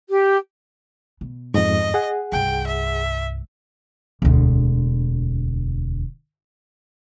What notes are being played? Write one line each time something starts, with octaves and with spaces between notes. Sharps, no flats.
G4
B2
F2 G#2 D#5
G#4 F#5
C2 G2 G5
E5
E1 D2